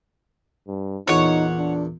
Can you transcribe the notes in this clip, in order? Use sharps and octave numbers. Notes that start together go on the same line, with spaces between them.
G2
E2 A#2 D#4 C#5 F#5
D4